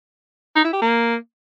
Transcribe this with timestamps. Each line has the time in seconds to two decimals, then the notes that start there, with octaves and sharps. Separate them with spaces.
0.56 D#4
0.64 E4
0.73 G4
0.81 A#3